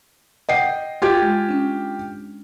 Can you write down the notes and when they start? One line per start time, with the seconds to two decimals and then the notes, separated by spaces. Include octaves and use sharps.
0.49 D#5 F#5 G5 C7
1.02 F4 G4 G#6
1.22 G#3
1.49 C#4 D4